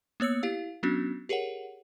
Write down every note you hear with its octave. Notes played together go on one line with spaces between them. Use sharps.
A#3 B3 C#5 E6 C#7
E4 G4 F5
F#3 B3 C#4 D4 F#4
G4 G#4 A#4 C#5 F#5